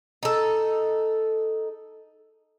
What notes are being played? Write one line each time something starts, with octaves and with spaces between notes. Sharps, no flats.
D#4 A4